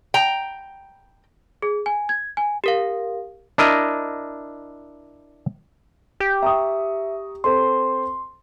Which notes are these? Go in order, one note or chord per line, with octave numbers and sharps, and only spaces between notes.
G5 A#5
G#4
G#5
G#6
G#5
G4 A#4 F5
D4 E4 A#4 D#5
G4
E5 A#5 C#6 D#6
C4 A4 C5 C6